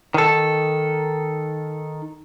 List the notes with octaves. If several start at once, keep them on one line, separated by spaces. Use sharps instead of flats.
D#3 A4